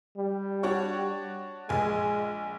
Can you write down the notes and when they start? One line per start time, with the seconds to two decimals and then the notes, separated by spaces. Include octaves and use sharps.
0.17 G3
0.63 D4 F#4 C#5
1.69 A#1 G#3 G#5